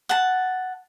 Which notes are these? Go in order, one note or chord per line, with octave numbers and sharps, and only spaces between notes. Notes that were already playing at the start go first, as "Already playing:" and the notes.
F#5 A5